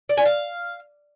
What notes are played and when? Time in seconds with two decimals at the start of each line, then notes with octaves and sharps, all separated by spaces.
0.09 D5
0.18 G#5
0.26 F5